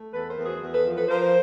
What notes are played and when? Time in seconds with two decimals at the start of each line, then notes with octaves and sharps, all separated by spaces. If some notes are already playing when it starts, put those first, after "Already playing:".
Already playing: A3
0.14 E2 A4 B4
0.29 A#4 C5
0.38 E2
0.45 F#4 G#4
0.62 E2
0.73 A4 B4
0.85 F3
0.96 A4 B4
1.08 F3 A#4 C5